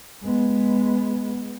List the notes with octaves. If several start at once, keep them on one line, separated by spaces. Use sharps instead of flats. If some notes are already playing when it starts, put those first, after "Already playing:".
G#3 B3